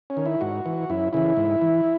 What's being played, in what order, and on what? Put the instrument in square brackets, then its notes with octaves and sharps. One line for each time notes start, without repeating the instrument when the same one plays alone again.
[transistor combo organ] C#4
D#3
E4
G#2 F#4
E3
F#2 E4
C#3 E3 E4
G#2
E3